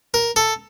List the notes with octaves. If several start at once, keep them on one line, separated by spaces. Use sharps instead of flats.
A#4
A4